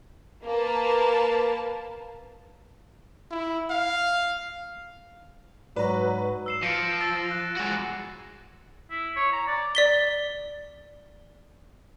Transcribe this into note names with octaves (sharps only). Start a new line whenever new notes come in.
A#3 A#4 B4 A5
E4
F5
G#2 F#3 B4 D5 A#5
E6 C7 E7
F3 A#6 C#7 D7
E6 A6
F#6
G#3 F#4
E4
C#5
A#5
D5
D5 B6 G7